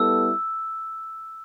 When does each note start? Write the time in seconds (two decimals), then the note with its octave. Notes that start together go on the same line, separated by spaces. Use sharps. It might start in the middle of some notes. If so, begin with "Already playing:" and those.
Already playing: G3 B3 E4 A4 E6